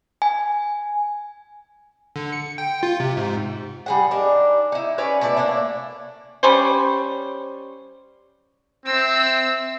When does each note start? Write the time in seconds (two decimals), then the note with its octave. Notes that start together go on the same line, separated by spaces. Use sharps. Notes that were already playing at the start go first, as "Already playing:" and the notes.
0.22 G#5
2.16 D3
2.32 C#7
2.58 G5
2.83 F4
3.00 C3
3.17 G#2
3.86 G3 G#4 F#5
4.11 D4 D#4 A#4
4.72 D#4 E4
4.98 C#4 B4 C#5 D5
5.21 B2 A3 E4 D5
5.37 A3 A#3 D4 E4
6.43 G3 C#4 C5
8.85 C4 E5 E6